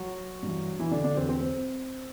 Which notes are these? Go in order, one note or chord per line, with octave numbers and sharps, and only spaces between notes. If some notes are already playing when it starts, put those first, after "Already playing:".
Already playing: F#3 F#4
G2 E3
E3 E4
D3 D4
D3 D4
E2 D3 F#3 C4
C4
C4